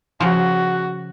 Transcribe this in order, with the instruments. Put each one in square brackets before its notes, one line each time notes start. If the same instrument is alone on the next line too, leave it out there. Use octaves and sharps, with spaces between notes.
[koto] C#3 F3 [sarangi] F#4